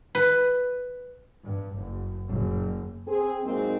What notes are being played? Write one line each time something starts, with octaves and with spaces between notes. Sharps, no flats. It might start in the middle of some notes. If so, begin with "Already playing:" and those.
B4
G2
F#1
F#1
C4 G#4
F#2 A#2 G#3 A#3 C4 D#4